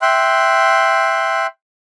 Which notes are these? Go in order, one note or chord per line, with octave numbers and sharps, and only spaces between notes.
E5 G5 C6 F#6